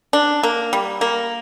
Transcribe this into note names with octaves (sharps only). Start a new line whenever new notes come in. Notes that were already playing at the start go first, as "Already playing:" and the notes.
D4
A#3
G3
A#3